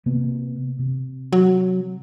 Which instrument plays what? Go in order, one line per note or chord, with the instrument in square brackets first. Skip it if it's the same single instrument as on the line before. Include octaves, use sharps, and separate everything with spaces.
[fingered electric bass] C3 A#3 B3
C3
[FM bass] F#3